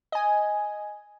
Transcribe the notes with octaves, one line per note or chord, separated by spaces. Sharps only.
D#5 G#5